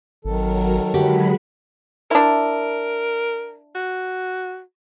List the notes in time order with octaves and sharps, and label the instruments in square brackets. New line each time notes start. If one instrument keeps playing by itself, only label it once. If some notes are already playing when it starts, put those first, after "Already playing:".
[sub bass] G#1 [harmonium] D#3 A4 [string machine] F#3 A#4
[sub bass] D3 [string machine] F#3 G#3 B5 [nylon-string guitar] F#4 G4
[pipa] D4 E4 [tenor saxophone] A#4
[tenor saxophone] F#4